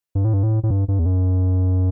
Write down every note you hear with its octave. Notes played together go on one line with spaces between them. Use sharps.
G2
A2
G2
A2
A2
G2
G2
E2
F#2